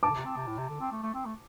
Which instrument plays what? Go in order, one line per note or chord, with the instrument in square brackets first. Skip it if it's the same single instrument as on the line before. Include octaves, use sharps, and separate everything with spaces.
[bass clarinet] G2 [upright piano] A5 D6
[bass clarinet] D3
C3
C4
C3
A2
C3
D3
C4
A3
A3
C4
A3